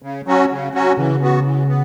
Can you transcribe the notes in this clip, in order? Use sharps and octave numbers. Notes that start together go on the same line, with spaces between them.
C#3
F#3 C#4 F#4
C#3
F#3 C#4 F#4
C#3 E3
B3 F#4
E3
B3